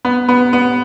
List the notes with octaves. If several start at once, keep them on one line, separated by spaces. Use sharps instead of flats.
B3
B3
B3